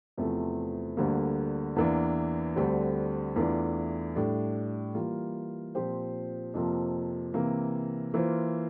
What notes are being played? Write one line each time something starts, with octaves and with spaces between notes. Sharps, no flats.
E2 C3 F3 A3
D2 D3 G3 A#3
E2 E3 A#3 D4
D2 D3 G3 C4
E2 E3 A3 D4 F4
A2 G3 D4
E3 G3 A#3 F4
A#2 F3 C4 G4 C5
F2 C3 F3 A#3
C3 E3 A#3
E3 A#3 F4 C5